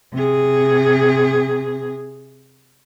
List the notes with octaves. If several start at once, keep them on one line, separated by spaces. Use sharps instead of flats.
C3 G#4